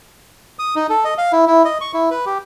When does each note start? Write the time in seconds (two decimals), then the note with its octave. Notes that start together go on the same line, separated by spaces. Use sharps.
0.59 D#6
0.76 D#4
0.90 A4
1.04 D#5
1.18 F5
1.32 E4
1.47 E4
1.65 D#5
1.81 C#6
1.94 E4
2.11 B4
2.26 G4